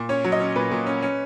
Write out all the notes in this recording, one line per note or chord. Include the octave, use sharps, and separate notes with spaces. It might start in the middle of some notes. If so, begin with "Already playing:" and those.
Already playing: A#2
C#4 C#5
F#3
D#5
C#4
A#2 B4
A#2
C#4
C#4